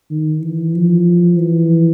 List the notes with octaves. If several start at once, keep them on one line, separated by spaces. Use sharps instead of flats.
D#3
E3
F3
E3